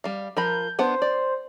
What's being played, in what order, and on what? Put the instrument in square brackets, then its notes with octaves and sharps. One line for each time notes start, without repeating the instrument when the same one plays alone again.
[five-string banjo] G3 F5
[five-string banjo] F3 A#4 B5 [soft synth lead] G6
[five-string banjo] B3 D4 F#5 [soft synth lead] C5
[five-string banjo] D5